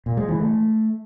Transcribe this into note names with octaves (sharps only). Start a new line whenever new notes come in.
A#2
G#3
E3
A3